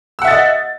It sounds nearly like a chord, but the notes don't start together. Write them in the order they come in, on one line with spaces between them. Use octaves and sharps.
E6 F#5 E5 A6 D#5